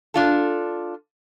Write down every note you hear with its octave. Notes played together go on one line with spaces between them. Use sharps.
D4 F4 A4